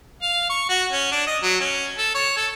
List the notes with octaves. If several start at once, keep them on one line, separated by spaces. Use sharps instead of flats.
F5
C#6
F#4
C#4
D4
D#5
F#3
C#4
A4
C#5
A4